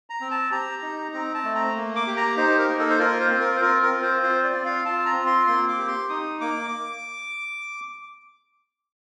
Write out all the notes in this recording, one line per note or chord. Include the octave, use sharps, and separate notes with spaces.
A#5
C4
A5
G4 A#5
D#4
C4 A#5
A5
A3
A#5
A#3
D6
G4
A#5
D#4 C5
A#4
A#3
A4
C5
F4 A#4
C5
C4
A#4
C5
F4 A#4
A#4
C4
C5
F4 C5
D5
C4
F5
F4 A5
A#5
C4
C6
A#3 C6
D6
G4
C6
D#4 D#6
A#3 D6